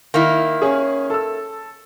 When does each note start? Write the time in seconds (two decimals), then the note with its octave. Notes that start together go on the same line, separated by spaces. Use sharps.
0.14 D#3 A#3 E4
0.62 C#4 G#4
1.10 A4 E6